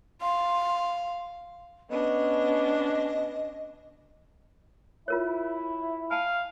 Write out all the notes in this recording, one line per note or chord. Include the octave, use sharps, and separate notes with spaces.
F5 C6
B3 C#4 D4 D#5
E4 F4 A#4 C#5
F5 G#5 A5